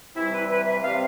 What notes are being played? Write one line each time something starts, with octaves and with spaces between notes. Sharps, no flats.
C3 E3 G3 E4
B4
B4
E5
C3 G3 C4 F5